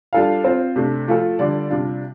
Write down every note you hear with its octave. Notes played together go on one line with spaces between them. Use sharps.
G3 D4 F4 A4 F5
C4 F4 C5
C3 A3 D4
F3 A3 F4 A4
D3 G3 F4 D5
C3 G3 D4 F4